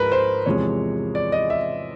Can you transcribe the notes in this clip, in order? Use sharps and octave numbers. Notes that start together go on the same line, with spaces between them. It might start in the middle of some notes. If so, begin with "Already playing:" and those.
Already playing: G#2 F3 G#3 A#4 B4
C5
E2 C3 F3 G#3 C#5
D5
D#5
E5